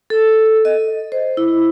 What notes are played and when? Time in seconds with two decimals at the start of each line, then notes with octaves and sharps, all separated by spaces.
0.10 A4
0.65 D#5
1.12 C5
1.37 E4